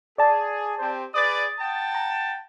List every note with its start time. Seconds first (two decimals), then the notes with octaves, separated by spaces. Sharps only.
0.18 G#4 D5 A5
0.79 C4 G4 C5
1.14 G#4 B4 D5 D#6 A6
1.60 F#5 G5 A5
1.95 A#5